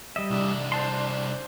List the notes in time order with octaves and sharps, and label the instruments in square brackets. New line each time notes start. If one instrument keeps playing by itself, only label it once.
[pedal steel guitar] G3 D#5 E5
[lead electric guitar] C2 D4
[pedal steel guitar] C5 A5 C6